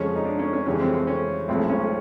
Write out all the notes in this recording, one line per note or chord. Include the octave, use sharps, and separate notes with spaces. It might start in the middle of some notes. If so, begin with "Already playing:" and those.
Already playing: F2 C#3 F3 G#3 C#4
D#4
D4
C#4
C#4
F2 C#3 E3 G3 C#4
C4
C4
C#4
B1 A2 F3 G#3 C4
C#4